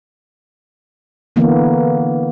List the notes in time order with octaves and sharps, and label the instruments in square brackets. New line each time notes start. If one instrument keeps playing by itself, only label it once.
[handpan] D3 E3 A#3 B3